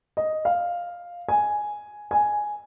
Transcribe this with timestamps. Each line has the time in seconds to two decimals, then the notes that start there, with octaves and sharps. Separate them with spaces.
0.17 D#5
0.45 F5
1.29 G#5
2.11 G#5